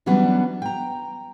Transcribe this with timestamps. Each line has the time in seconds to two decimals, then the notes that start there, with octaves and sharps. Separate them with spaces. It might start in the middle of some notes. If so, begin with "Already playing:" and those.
0.06 E3 F#3 G3 B3 C#4 D4
0.62 G5 A#5